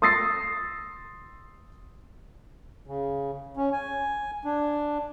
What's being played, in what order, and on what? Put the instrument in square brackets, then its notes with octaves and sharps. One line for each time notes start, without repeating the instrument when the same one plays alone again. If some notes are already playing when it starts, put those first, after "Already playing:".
[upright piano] C6 D#6 E6 A6 A#6 C7
[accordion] C#3
C#4
G#5
D4